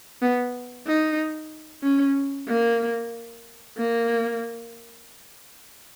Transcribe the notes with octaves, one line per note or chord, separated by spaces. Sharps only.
B3
D#4
C#4
A#3
A#3